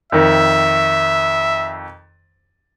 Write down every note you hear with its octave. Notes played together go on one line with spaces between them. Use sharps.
F2 D#3 E5